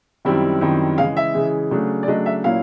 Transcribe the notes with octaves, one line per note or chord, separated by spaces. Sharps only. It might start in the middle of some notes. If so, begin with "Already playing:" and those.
F#2 D#3 G3 C4 E4
F#2 D#3 G3 C4 E4
C#3 E3 G#3 F5
E5
C#3 E3 G#3
C#3 F#3 A3 D4
D5
C#3 F#3 A3 D4 D#5
E5
A#2 F#3 A#3 C#4 E4 F5